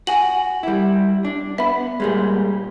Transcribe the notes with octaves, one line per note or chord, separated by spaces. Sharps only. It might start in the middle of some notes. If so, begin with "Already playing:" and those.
F#4 F#5 G#5 F#7
G3 E4
D4
B3 E5 B5
A#2 G3 G#3